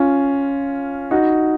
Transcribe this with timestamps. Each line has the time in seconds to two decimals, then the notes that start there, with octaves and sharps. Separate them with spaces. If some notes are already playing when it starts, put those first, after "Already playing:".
Already playing: C#4 F4
1.11 D#4 F#4